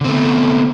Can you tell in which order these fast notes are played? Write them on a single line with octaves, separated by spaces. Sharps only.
D3 C4 A3 B3